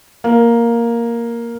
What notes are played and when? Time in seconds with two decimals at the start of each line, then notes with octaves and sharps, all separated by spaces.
0.24 A#3